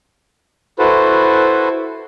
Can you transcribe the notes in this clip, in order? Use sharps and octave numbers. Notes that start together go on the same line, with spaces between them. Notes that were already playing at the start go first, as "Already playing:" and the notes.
E4 F#4 A4 B4 C5